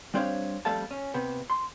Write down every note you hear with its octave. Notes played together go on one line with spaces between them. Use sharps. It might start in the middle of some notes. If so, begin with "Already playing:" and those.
G3 C4 D4 C5 C#5 F5
F2 G3 A3 A4 F5 A5
C#4
C3 B3
C6